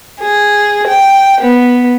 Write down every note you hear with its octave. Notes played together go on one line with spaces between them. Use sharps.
G#4
G5
B3